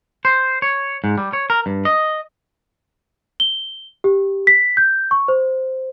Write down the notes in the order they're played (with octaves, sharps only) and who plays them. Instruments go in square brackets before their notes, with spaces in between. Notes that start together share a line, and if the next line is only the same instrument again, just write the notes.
[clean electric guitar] C5
C#5
G#2
G3
C#5
A#4
G2
D#5
[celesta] G7
G4
B6
G6
C#6
C5